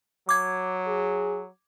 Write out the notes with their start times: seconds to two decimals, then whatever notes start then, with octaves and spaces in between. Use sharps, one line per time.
0.29 F#3 D6 G#6
0.87 G#4